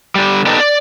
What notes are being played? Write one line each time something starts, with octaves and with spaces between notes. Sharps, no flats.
D3 G3
B3 D4 D#4 G4 A4 A#4
D5